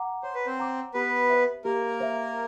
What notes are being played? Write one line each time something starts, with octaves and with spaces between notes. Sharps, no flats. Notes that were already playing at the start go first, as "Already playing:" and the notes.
Already playing: F#5 A#5 D6
C5 C#5
B4
C4 C5
F#5 A#5 D6
B3 G4 B4
C5 E5
A#3 G4 A#4
C5 E5